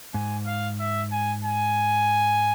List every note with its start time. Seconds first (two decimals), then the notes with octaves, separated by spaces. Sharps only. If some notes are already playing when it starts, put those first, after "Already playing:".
0.14 G#2 G#5
0.47 F5
0.80 E5
1.12 G#5
1.45 G#5